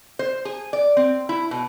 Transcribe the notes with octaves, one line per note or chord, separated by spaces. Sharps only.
C5
G#4
D5
C4
E4
B2